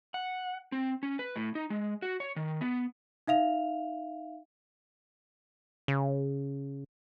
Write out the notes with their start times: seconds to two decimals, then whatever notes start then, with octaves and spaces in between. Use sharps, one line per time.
0.14 F#5
0.72 C4
1.03 C#4
1.19 B4
1.36 A2
1.55 D#4
1.70 G#3
2.02 F#4
2.20 C#5
2.36 D#3
2.61 B3
3.28 D#4 E5 F5 F7
5.88 C#3